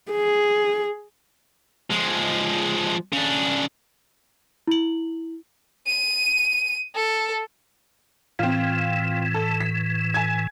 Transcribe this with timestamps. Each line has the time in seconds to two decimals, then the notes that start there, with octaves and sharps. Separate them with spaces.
0.12 G#4
1.90 F3 G#3
3.13 C#3 D4
4.67 E4 F#7
5.87 D#7
6.95 A4
8.39 A2 E3 C4 F4
9.34 A4
9.60 B6
10.14 G#5 G#6